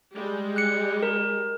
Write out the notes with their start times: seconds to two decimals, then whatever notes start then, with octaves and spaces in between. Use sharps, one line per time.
0.14 G3 G#3
0.56 F#6 C#7
1.03 A#4